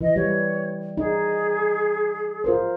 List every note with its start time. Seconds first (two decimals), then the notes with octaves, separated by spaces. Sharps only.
0.01 E3 D#5
0.16 G3 C#5
0.97 D#4 G#4
2.44 F4 A#4 C5